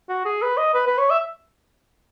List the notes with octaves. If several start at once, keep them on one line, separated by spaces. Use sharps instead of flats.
F#4
G#4
B4
D#5
B4
B4
C#5
E5